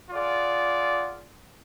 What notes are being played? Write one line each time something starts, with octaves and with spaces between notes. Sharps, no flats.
F4 G#4 D5 F#5